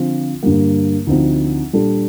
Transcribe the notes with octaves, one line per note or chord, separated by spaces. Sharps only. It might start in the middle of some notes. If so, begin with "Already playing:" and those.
Already playing: D3 F3 C4 F4
G2 D3 G3 A#3
D2 D3 F3 C4 D#4
A#2 G3 D4 A4